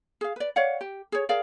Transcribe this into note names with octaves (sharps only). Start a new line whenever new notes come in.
G#4 F5
B4 D5
C#5 D5 F5 F#5
G4
G#4 C#5
G#4 A#4 D5 F5